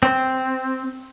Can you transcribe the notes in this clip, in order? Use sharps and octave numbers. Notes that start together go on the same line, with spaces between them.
C4